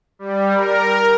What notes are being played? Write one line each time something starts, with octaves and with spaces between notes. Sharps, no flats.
G3
A#4